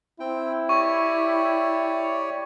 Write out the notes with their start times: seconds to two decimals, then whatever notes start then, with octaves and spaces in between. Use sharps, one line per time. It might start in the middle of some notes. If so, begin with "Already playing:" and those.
0.20 C4 E4 G5
0.69 G4 C#5 D5 C#6